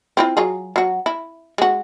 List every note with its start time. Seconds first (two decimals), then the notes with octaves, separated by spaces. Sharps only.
0.17 C4 E4 F4
0.37 F#3 F4 G#4
0.76 F#3 F#4
1.06 E4
1.58 G#3 F#4